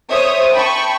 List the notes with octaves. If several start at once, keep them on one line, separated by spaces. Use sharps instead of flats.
C5 C#5 E5 D#6
G5 A5 B5 C#6